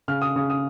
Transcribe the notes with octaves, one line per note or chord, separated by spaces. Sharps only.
C#3 F6
D#6
C#3 D#6
D#6